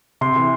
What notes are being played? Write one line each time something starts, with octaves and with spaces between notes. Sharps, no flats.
C3 C6
E3